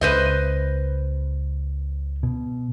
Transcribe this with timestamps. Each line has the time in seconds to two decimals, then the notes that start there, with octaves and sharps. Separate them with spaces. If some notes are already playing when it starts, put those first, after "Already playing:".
0.01 C#2 B4 C5 D#5
2.23 B2